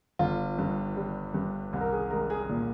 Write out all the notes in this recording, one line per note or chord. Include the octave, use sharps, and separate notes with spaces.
G1 F4
G2
G3
G2
C2
A#4
G#4
G#3 A#4
G#4
A#2